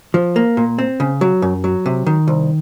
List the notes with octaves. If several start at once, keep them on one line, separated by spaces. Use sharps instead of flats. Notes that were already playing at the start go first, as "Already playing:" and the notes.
F3
A#3
A#2
C4
C#3
F#3
F#2
F#3
C3
D#3
C2